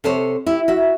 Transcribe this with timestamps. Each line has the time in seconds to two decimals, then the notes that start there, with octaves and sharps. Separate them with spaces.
0.04 C3 A4 C5 C#5
0.46 E4 G4
0.68 F#4 E5